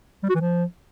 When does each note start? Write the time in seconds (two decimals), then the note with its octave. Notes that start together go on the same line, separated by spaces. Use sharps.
0.23 G3
0.29 F#4
0.35 E3
0.41 F3